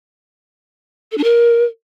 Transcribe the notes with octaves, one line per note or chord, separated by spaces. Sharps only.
A4
D4
A#4